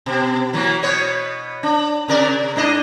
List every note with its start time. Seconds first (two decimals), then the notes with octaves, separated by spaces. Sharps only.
0.06 B2
0.53 E3 F#3 A#3
0.83 B2 B3 C#5
1.63 D4
2.08 C3 A#4 D5
2.56 G#2 D4 D#5